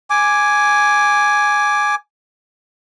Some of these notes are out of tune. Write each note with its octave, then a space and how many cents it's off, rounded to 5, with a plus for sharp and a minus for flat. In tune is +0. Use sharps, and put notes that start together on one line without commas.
G#5 +0 D6 +0